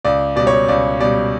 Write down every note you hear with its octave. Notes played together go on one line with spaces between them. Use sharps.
C#2 D5
B2 G3 D5
C#5
C#2 D5
B2 G3 D5